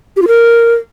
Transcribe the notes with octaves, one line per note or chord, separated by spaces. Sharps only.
G4
F4
A#4